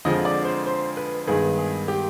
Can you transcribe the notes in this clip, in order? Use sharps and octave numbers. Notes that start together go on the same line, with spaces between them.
F2 D3 F3 G#3 D#5
D5
C5
C5
B4
G2 D#3 G#3 B3 G#4
G#4
G4